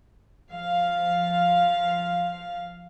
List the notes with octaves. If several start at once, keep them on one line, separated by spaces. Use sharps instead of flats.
F3 F5